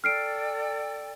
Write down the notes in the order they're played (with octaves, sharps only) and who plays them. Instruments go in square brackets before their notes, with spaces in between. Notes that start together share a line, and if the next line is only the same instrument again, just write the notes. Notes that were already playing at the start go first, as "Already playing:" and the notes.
[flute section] A4 D5 G5 [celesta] F6 C7 D7